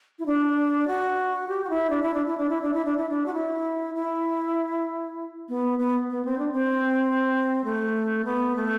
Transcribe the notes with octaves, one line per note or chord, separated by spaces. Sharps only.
E4
D4
F#4
G4
F#4
E4
D4
E4
D4
E4
D4
E4
D4
E4
D4
E4
D4
F#4
E4
E4
B3
B3
B3
C4
D4
C4
A3
B3
A3